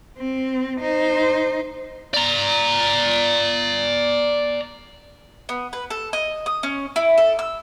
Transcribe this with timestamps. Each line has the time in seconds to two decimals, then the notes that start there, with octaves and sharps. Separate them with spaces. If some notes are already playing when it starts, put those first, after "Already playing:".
0.18 C4
0.80 D#4 C5
2.14 D5 A#5
5.49 B3
5.73 B4
5.90 A4
6.13 D#5
6.46 D#6
6.63 C#4
6.96 E4
7.18 A4
7.39 E6